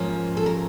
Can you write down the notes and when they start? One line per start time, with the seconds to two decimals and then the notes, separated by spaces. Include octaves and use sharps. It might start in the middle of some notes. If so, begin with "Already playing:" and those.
Already playing: G#2 F3 A#3 C#4
0.37 A4
0.46 A#4